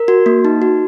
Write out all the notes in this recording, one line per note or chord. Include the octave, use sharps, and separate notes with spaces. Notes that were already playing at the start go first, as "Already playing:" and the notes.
Already playing: A#4
F#4
A#3
D#4
F#4